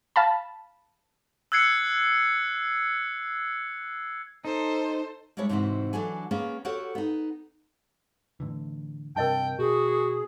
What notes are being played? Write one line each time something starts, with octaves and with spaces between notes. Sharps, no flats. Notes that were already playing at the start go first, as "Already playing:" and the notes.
F5 A5 B5
E6 F#6 G#6 C7 C#7
D#4 A4 C5
G3 G#3 D4 E4 C#5
G#2 C3 E3 C4 F#4
E3 F#3 D4 A4 F#5 G#5
A#3 B3 C#4 G#4
F#4 G4 A4 A#4 C#5 F#5
B3 D#4
A2 D3 E3
G2 C3 A#4 D#5 G5 A5
B2 F#4 G#4